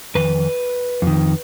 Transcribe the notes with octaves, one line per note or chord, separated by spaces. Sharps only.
F2 D#3 B4
F2 D#3